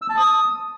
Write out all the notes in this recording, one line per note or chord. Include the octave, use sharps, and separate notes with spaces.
E6
A5
D#6